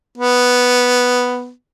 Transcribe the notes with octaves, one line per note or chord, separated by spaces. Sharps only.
B3